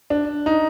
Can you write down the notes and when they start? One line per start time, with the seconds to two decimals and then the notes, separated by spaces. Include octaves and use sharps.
0.10 D4
0.46 D#4